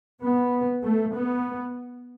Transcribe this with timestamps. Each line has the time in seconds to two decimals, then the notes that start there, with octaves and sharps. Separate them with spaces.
0.22 B3
0.83 A3
1.14 B3